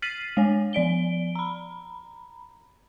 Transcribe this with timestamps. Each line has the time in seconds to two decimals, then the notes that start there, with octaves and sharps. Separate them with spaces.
0.02 F6 A6 B6 C7 D#7 F#7
0.37 G#3 C#5 G#5
0.73 F3 D5 D7 G7
1.35 A#5 B5